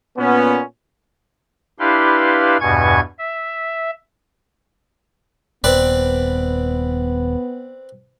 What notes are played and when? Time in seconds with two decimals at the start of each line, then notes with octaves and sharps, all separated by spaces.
0.18 A#2 B3 C#4
1.79 D4 E4 G4 B4 F5 C6
2.60 E2 G2 B2 G#5 C#6 G#6
3.19 E5
5.64 D#1 B3 C4 B4 D5